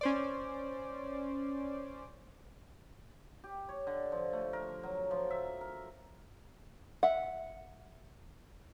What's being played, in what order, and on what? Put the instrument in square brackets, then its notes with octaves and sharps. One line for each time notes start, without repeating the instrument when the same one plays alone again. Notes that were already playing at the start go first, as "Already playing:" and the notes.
[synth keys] C#4 C5 D5
[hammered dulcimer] G4
C#5
D3
F3
A3
A#4
F#3
F3
E5
A#4
[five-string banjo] E5 F#5